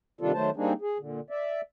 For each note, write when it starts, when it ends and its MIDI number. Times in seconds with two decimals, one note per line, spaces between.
0.21 0.32 48
0.21 0.32 51
0.21 0.32 55
0.21 0.32 62
0.21 0.32 65
0.21 0.32 69
0.34 0.50 51
0.34 0.50 54
0.34 0.50 57
0.34 0.50 72
0.34 0.50 81
0.56 0.73 55
0.56 0.73 58
0.56 0.73 60
0.56 0.73 62
0.56 0.73 63
0.56 0.73 68
0.81 0.98 68
0.99 1.20 46
0.99 1.20 50
1.30 1.61 74
1.30 1.61 76